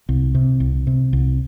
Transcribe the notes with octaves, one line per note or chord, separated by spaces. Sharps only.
C2
C3
C2
C3
C2